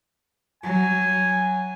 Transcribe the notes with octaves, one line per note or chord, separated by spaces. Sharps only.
F#3 G#5